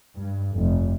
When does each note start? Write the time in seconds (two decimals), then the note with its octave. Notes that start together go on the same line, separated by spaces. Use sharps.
0.16 G2
0.55 F1